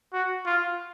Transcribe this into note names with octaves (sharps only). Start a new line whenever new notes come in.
F#4
F4